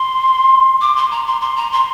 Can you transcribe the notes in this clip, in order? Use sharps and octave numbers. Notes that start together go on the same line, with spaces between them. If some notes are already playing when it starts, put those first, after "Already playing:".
Already playing: C6
D6
C6
A#5
C6
C6
A#5
C6